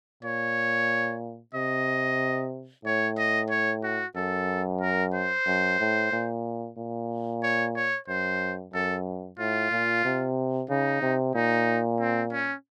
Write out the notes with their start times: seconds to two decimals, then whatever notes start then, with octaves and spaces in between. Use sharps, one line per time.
0.23 A#2 C#5
1.55 C3 D#5
2.85 A2 C#5
3.18 D#5
3.50 C#5
3.83 F#4
4.16 F#2 A4
4.81 A#4
5.14 C5
5.46 F#2
5.79 A2
6.12 A#2
6.77 A#2
7.43 C#5
7.76 C#5
8.08 F#2 C5
8.73 F#2 A4
9.39 A2 F4
9.72 A#2
10.05 C3
10.69 C#3 D#4
11.02 C3
11.35 A#2 D#4
12.00 C4
12.32 C#4